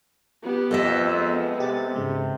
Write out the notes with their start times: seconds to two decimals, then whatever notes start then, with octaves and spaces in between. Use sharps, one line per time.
0.42 B3 G4
0.71 F2 A4 D#5 E5
1.16 G#3 B3
1.60 C3 G4 A6
1.96 G#2 C#3 G#3